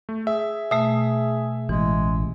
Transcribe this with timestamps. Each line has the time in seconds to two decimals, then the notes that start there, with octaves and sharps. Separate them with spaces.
0.09 A3
0.27 G#4 E5
0.71 B2 A3 E5
1.69 A1 E3 G#3